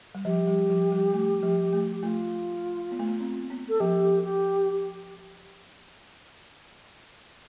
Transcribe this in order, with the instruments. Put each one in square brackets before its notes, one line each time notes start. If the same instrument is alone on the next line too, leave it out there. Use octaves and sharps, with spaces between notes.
[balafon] G3
[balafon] F3 [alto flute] G4
[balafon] G3
F3
G3
A3
F3
A3
[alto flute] G4
[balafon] A3 [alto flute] F4
[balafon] B3
A3
B3
C4
B3
[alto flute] A4
[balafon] F3 [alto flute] G4
[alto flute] G4